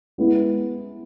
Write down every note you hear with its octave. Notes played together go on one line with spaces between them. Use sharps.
G#3 B3 E4